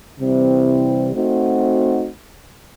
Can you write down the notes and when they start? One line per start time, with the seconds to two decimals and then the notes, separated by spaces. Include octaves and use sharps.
0.18 C3 E3 G3 C4 E4
1.15 A3 C4 D#4 F#4